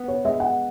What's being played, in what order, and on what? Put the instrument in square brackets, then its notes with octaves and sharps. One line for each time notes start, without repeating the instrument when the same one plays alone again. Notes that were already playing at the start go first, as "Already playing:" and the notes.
Already playing: [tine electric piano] B3
[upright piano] C#5
[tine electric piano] G#3 [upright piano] E5
[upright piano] F#5